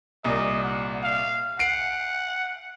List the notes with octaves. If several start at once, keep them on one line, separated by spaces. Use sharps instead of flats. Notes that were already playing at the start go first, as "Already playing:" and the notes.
C2 A#2 D#5
F#5
F5
F#5 C7 D7